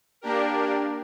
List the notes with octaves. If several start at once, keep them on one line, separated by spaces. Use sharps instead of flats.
A#3 D4 G4 A#4